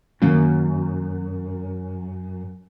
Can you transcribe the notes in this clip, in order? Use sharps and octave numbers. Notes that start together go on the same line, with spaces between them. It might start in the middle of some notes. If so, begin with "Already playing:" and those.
F#2 D#3 A#3 C#4